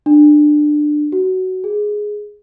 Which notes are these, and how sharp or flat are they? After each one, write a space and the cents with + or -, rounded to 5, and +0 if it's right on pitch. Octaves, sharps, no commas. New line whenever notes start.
D4 +20
F#4 +15
G#4 +5